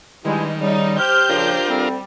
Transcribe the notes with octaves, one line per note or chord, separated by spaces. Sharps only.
G2 D#3 G3 G#3 E4
C#3 G3 D#4
G4 C5 F6 G6
A#2 C#3 F3 D4 F4 A#4
D2 G3 C4